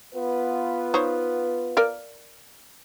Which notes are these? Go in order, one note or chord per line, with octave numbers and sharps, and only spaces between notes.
B3 F4 B4
D#4 C5 C#5
A#4 D5 F5